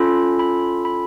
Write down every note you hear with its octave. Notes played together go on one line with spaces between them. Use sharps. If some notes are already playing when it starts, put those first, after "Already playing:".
Already playing: C#4 F4 A4 B5
B5
B5